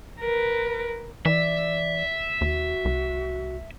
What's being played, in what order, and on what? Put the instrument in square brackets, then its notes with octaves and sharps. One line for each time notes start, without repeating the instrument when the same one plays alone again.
[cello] A#4 B4
[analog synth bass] E3 [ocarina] D5 [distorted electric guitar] E5
[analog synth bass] D#2 [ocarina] F#4
[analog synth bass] C2